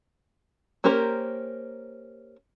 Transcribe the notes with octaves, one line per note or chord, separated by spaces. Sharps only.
A#3 C#4 G4 A#4 C5